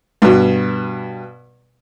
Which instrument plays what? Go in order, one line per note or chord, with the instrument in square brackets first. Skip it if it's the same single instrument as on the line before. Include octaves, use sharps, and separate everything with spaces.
[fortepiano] G2 B2